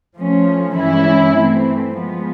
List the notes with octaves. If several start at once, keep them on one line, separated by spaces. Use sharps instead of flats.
F3 A3 C#4
G2 E3 G#3 C#4 E4
E3 A3 C4
F3 G#3 B3